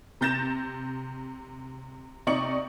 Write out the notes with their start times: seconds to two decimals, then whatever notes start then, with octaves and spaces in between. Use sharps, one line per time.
0.21 C3 A#5 G6 A6 A#6 E7
2.27 C3 D#4 D5 C#6 C#7 F#7